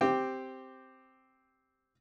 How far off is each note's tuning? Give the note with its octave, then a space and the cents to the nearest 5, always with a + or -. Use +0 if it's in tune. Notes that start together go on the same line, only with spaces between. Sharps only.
C4 +0 G4 +0